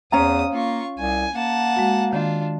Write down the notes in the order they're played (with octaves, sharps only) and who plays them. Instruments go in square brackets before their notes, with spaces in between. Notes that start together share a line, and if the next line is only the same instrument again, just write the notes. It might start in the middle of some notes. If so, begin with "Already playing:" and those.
[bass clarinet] E2 [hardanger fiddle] C4 D#6 [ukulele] C#4 F5 A#5
[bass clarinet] A#3 [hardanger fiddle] F4 C#6
[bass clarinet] C2 [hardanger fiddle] G#5
[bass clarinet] A#3 [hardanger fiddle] F#5 A5
[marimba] G#3 F#4
[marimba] D#3 [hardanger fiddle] D4 F4